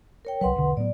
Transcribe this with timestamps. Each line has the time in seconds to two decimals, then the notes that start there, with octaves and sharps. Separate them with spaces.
0.25 A#4 C#5 G5
0.41 C2 F#3 B4 F#5 C6
0.56 E1 B1 D3
0.77 A2 F#3 B3 D5